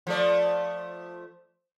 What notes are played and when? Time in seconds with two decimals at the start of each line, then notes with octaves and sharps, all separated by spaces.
0.07 F3 A3 D5